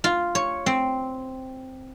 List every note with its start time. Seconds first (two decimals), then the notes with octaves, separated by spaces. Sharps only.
0.04 F4
0.35 C#5
0.66 C4